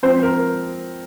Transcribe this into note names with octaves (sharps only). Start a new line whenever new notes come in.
F3 C4 C5
A#4